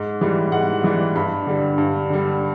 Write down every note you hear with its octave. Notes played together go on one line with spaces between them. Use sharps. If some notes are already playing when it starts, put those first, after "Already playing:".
Already playing: G#2
E3 G3
G#2 F#5
E3 G3
G2 B5
D3 G3
G2
D3 G3